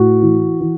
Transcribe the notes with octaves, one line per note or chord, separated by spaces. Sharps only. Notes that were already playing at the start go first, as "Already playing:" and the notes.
Already playing: A2 F#4
E3
E3